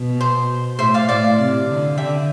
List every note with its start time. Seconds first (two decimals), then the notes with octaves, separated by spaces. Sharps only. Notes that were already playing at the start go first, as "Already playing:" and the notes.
Already playing: B2
0.21 C5
0.79 A2 C5 E5
0.94 D5 F5
1.09 A2 D5 F5
1.39 C3
1.68 D3
1.98 D3 E5 G5